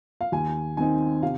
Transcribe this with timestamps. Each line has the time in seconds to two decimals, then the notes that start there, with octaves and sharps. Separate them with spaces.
0.21 F5
0.32 D#2 G#5
0.77 D#3 C4 D#4 G#5
1.23 C3 F5